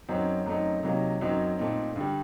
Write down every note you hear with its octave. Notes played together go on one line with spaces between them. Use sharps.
F#2 F#3 C4 D#4
F#2 F#3 A3 C4 D#4
C3 F#3 A#3 D#4
F#2 F#3 C4 D#4
A#2 A3 C4 D#4
G2 D3 G3